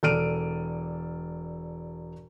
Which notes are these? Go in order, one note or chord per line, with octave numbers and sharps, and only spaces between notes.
E1 A4 D5 F6 D7 D#7